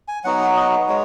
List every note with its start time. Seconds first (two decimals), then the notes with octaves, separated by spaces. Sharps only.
0.08 G#5
0.24 F#3 B3 D#4 F#4 F#5
0.56 D#5
0.89 G#3 C#5